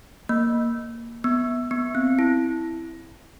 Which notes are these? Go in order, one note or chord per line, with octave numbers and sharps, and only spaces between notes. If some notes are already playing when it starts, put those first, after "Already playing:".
A#3
B3
B3
C4
E4